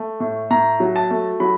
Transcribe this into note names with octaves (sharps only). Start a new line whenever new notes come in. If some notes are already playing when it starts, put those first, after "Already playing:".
Already playing: A3
A2
A2 A#5
F#3
A5
A3
F#3 B5